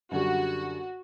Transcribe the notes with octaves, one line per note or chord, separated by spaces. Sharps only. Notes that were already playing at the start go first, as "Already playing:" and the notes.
F#2 D3 G3 F#4